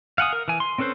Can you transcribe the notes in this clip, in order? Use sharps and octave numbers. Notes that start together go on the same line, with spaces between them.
F5 F#5 G#5 D#6
A#4
E3 G#5
C6
C4 C#4 A4 B4 C5